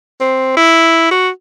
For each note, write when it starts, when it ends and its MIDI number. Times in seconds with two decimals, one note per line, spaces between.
0.21 0.52 60
0.57 1.11 64
1.11 1.29 66